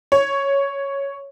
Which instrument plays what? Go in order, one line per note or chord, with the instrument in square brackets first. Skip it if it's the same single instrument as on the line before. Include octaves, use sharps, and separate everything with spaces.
[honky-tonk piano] C#5